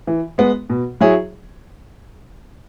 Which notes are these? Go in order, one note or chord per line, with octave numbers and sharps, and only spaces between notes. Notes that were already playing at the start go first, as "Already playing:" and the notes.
E3
G#3 B3
B2
F#3 E4 G#4 C#5